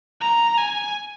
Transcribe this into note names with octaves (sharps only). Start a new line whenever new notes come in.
A#5
G#5